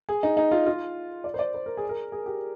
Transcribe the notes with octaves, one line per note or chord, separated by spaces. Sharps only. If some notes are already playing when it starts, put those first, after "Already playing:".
G#4
D#4
D#4
F4
F4
D5
C5
D5
C5
A#4
G#4
A#4
G#4
G4